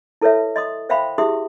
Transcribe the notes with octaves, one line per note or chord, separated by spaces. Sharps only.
E4 A4 B4 C#5 E5
D#5 C6 D#6
C5 E5 F5 G5 B5 C6
E4 G4 G#4 E5 C6 D#6